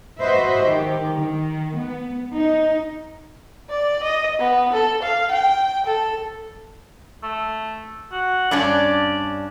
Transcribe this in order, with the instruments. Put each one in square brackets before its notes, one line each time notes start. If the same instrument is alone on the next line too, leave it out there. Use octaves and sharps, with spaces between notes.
[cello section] F#4 B4 C5 D#5 E5
D#3 G4
D#3
B3
D#4
[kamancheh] D5
D#5
B3
A4
F5
G5
A4
[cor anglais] A3
F#4
[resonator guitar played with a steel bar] G2 C#4 D4 [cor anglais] D5